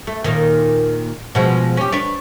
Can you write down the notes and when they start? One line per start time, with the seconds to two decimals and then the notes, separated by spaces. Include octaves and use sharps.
0.07 A3
0.24 D#2 A#2 D#3
1.35 B2 F3 G#3
1.77 C#4 G4
1.92 D4 B4 C#5